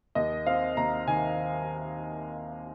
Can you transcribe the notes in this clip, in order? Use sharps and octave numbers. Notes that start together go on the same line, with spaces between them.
D#2 D#5
C4 F5
D#2 A#5
D#3 G#5